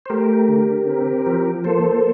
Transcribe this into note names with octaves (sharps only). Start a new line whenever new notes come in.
C5
A3 G4 A#4
D3
C4
F3
A#3 A4 C5